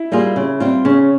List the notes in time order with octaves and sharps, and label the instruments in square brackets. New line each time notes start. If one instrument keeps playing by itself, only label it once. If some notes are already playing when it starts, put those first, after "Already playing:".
Already playing: [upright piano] E4
[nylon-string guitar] G3 A#3 F4 G#4
C#3
G3 C4 F4
[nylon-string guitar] C#3 [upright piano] C#4